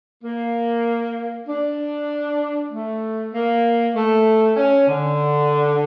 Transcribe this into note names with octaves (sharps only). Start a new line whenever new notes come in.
A#3
D4
A3
A#3
A3
C#4
D3